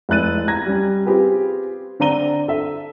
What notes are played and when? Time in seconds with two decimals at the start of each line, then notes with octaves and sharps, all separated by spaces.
0.09 F1 G#3 E4 F#6 A6 D#7
0.48 A#5 G#6 A#6
0.66 G3 C#4
1.06 C4 F4 G4 G#4 B4
2.00 D3 C4 D5 A#5 D#7 G7
2.48 A4 E5